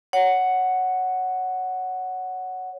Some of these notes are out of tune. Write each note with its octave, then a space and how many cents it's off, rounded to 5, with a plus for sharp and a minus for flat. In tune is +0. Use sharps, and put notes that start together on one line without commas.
C#5 +10 F#5 +0